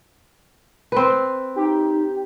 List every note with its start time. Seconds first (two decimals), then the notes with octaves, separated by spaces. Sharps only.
0.92 C4 B4
1.56 D#4 G4